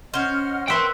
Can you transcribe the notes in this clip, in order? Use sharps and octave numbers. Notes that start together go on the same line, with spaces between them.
C#4 C5 D#5 F#5 F6
B4 E5 F#5 G5 C6